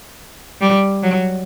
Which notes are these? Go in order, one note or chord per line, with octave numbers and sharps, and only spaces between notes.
G3
F#3